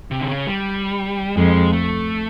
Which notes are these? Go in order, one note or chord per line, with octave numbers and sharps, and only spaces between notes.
C3
D3
C#3
G3
F2 G#3
A3